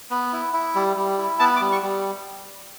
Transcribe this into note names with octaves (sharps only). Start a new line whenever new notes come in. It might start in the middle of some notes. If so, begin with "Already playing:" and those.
B3
E4
E4
G3
G3
E4
B3 A5
D6
G3
C#6
G3